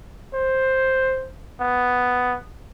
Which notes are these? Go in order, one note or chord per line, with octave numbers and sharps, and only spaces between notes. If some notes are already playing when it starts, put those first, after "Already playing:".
C5
B3